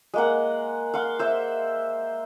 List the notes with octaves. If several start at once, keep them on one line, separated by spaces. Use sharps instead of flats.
G#3 A#3 F#5
F5 F#5 C6
C5 E5